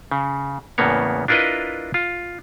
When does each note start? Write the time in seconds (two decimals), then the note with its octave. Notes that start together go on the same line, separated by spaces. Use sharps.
0.11 C#3
0.78 E2 A2 C#3 A#3 B3 C#5
1.28 D4 E4 F4 A#4 B4 D#5
1.94 F4